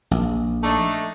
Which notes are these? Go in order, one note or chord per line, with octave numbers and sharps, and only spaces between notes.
A#1
A3 D4 D#4